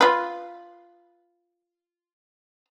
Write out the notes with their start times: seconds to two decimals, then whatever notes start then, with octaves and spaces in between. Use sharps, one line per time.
0.01 F4 B4